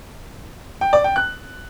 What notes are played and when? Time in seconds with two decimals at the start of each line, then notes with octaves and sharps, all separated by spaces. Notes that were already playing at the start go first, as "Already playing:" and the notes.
0.81 G5
0.93 D5
1.04 G5
1.16 F#6